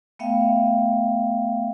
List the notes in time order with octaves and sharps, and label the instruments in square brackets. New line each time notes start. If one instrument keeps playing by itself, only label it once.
[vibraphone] A3 B3 E5 F5 G5